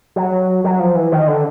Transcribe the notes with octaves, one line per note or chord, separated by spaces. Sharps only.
F#3
F#3
F3
E3
D#3
D3